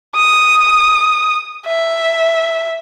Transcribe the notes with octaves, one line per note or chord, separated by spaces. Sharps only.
D#6
E5